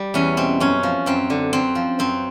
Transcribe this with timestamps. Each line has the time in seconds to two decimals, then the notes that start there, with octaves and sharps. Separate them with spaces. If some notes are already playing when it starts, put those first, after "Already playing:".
Already playing: G3
0.14 E2 C#4
0.37 B2 C4
0.60 F#2 C#4
0.83 F3
1.06 F#2 C4
1.30 D3
1.53 F#2 C4
1.75 F3
1.99 F#2 C4